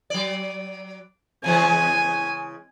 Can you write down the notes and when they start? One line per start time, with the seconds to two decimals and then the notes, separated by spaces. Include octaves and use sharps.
0.10 F#3 D5
1.44 C#3 E3 G#3 G#5